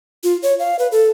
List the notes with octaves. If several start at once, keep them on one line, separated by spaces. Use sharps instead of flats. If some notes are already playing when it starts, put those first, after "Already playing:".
F4
C#5
F5
B4
A4